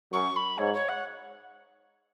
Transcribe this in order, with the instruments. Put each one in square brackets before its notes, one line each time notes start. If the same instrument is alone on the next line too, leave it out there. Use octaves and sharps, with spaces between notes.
[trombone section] F#2 [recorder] C#6
[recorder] B5
[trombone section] G#2 [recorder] C#5
[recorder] C#5
F#5